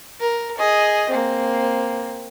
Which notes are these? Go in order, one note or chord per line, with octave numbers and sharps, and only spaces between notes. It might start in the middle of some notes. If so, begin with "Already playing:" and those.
A#4
G#4 D#5
A#3 C4